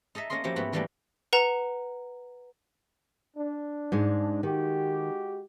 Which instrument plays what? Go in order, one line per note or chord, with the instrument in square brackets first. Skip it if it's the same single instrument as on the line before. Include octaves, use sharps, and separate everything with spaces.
[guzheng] D#4 A4 D#5 E5
A3 A#3 C#4 A#4 D#5 C6
F3 F#3 A#3 C#4 E4 G4
G#2 A3 B3 E4 F#4 G4
D#3 E3 G3 A3 A#3 D4
[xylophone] B4 F#5 A#5 E7
[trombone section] D4
[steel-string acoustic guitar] G#2 G#3
[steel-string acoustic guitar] D#3 [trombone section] G#3 F#4 G4